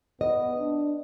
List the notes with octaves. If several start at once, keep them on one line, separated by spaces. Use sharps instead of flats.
B3 D#5
D4